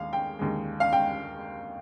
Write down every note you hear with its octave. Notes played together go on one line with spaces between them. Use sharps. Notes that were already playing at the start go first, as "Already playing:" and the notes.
Already playing: D#2 G#3 F5
G5
D#2 D3 G#3
F5
G5